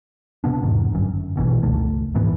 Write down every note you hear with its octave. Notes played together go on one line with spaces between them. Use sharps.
C3 B3 D4
E2 G#2 D#3
G1 F#2
A#1 B2 D3 E3
G1 C#2 D#3 A3
D#1 G#2 E3 B3